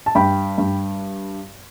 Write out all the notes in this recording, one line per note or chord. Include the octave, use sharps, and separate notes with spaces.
A5
G2 G5 B5
G2